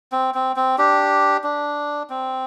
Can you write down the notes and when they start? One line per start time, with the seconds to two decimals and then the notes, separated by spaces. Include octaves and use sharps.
0.12 C4
0.34 C4
0.56 C4
0.78 D4 G4
1.44 D4
2.10 C4